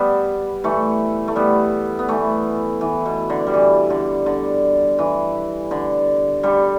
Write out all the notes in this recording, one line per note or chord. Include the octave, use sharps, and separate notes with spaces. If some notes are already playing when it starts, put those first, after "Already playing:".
Already playing: G3 B3
E3 A3
A3
G3 B3
B3
E3 A3
E3
B2
D3
G3
E3
D3
D3
E3
D3
D3 G3